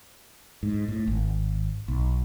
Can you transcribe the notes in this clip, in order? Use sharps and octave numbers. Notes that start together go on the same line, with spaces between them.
G#2
A2
G#1
B1